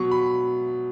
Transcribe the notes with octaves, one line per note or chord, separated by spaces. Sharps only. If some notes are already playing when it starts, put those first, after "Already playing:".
Already playing: B2 F#3 C#6
B5